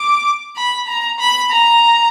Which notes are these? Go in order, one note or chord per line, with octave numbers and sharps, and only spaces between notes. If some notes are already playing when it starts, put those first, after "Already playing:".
Already playing: D6
B5
A#5
B5
A#5